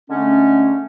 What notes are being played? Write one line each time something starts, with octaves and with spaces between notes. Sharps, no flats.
D3 G#3 A3 C#4